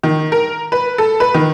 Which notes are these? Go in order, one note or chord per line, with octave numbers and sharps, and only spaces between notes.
D#3
A#4
B4
A4
B4
D#3